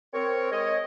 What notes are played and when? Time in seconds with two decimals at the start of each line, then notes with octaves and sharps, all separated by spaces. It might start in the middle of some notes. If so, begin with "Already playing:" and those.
0.14 C4 A#4 C#5
0.51 G#3 C#5 D#5